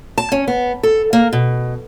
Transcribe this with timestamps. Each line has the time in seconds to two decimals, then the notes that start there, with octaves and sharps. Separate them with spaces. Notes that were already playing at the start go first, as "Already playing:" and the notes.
0.18 A5
0.32 C#4
0.48 B3
0.83 A4
1.13 A#3
1.33 B2